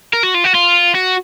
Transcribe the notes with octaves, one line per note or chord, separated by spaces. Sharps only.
A#4
F#4
F4
F#4
F4
F#4